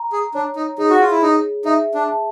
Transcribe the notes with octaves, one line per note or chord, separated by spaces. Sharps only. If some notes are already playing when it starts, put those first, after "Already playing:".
Already playing: A#5
G#4
D4 C#5
D#4
D#4 G#4
F#4
F4
E4
D#4 G#4
D#4 E5
D4
A5